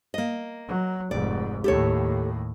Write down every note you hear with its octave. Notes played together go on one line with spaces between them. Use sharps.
A#3 D#5
F#3
F1 G#2 D5
D#2 A2 G4 A4 C#5